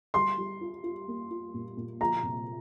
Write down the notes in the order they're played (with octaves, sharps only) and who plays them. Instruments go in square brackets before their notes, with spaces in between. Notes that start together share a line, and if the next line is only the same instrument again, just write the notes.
[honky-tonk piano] G3 [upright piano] C6
[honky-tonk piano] G3
F4
F4
A#3
F4
A#2
A#2
[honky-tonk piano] F3 [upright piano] A#5
[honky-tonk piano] C3